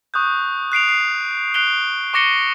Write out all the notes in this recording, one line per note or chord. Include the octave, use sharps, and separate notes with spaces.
C#6 D#6 F#6 G6
F#6 C7 D7 F7
C7
F#6 C7 D7 F7 G7
C#6 D6 A#6 C#7 G7